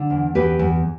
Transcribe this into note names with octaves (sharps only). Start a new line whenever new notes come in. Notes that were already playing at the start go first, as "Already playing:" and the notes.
Already playing: D3
E2
E2 G4 B4
E2